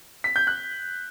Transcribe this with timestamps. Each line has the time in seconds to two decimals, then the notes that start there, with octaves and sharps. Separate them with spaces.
0.24 B6
0.36 G6
0.47 F#6